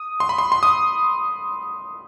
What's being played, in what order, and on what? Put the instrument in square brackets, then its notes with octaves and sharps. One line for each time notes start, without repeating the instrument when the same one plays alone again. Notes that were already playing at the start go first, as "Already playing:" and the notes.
Already playing: [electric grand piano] D#6
C6
B5
C6
C6
D#6